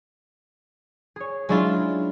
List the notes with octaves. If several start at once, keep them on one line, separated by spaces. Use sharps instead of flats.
G#4 C#5
F#3 G#3 C#4 D4 E4 F4